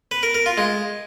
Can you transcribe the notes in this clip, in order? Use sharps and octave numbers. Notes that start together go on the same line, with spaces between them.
B4
A#4
A#4
F4
G#3